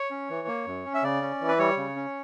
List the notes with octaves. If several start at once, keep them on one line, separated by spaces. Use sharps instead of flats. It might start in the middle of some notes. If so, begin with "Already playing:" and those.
Already playing: C#5
C#4
E3
A#3
F#2
C#4
E5
C#3 D5
C#4
E3
B4
G3 C#5
C#3
C#4